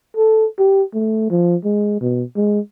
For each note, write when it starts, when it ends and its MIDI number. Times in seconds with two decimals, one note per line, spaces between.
0.17 0.46 69
0.59 0.82 67
0.94 1.26 57
1.30 1.56 53
1.65 2.00 56
2.01 2.23 47
2.36 2.60 56